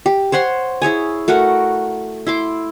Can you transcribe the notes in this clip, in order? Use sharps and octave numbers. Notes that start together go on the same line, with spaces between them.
G4
C5 C#5 F#5 C6
E4 G#4 C#5 G#5
A3 F#4 A#4 F#5
E4 C6 D6